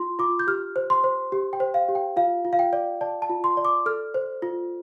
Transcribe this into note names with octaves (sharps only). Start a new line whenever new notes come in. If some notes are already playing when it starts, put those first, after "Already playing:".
Already playing: F4 C6
F4 D6
G6
G4 F6
C5
C6
C5
G4
G5
C5
F5
G4
G5
F4 F5
F4
F5
G5
D5
D5 A5
A5
F4
C6
D5
D6
A4 F6
C5
F4